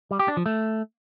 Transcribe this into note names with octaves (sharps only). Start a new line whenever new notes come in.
G3
G4
D4
F3
A3